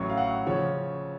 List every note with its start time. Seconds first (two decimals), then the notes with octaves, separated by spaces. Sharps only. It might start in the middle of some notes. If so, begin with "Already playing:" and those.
Already playing: A1 A2 F#3 C#6
0.10 F5
0.17 F#5
0.47 C#3 F3 C#5